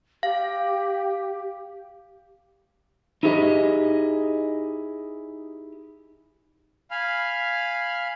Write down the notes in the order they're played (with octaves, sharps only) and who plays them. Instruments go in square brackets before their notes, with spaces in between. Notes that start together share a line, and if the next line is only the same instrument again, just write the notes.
[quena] G4 [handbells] F5
[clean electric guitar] D#4 E4 G4 G#4 C5 D#5
[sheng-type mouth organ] F5 G#5 B5 F6